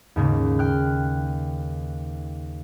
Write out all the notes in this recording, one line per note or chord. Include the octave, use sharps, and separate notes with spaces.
D#2 G#2 C#3
G5 F6 F#6